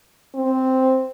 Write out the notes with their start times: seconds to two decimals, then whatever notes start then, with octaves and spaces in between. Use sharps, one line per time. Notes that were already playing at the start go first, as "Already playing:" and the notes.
0.35 C4